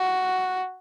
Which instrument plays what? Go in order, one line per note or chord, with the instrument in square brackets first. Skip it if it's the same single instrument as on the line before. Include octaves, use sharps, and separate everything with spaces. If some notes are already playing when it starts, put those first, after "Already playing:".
Already playing: [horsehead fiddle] F#4